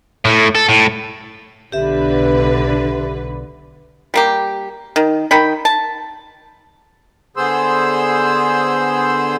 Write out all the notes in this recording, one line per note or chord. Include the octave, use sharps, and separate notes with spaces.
A2
A4
A2
B1 D3 G4 B4 E5
G3 A#3 G4
D#3
D#3 G5 B5
A5
D3 B3 G#4 C5 C6 E6